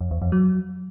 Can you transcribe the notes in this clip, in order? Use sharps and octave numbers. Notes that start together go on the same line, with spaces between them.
F2
E2
F2
F#3